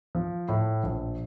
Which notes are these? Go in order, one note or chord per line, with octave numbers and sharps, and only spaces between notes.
F3
A2
A#1